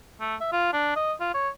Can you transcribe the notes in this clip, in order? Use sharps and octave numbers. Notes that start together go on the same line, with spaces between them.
A3
E5
F4
D4
D#5
F4
C#5